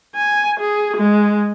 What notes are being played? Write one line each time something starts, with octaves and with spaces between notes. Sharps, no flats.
G#5
G#4
G#3